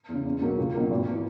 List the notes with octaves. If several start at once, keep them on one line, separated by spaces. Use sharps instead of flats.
E2
C#3
E2
B2 F#3 A#3
C#2
B2 F#3 A#3
G#1
E3